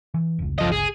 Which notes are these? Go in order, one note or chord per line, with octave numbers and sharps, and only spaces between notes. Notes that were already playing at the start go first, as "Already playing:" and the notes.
E3
F1 C#2
G1 C#2 F3 D#5
G#4